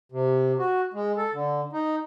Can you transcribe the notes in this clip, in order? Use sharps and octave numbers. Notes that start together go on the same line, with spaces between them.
C3
F#4
G#3
A4
D3
D#4